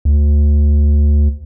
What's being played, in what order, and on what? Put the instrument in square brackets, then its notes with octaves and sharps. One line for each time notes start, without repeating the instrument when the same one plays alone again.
[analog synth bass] D2